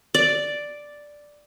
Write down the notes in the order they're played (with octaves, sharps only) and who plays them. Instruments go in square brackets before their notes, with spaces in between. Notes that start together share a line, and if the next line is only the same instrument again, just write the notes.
[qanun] D5